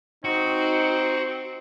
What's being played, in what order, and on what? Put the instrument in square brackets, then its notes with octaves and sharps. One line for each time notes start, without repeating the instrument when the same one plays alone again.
[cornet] C4 [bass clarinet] D#4 [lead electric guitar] F#4